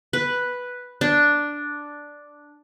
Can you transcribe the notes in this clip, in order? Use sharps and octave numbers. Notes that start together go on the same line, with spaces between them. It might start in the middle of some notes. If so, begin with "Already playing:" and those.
B4
D4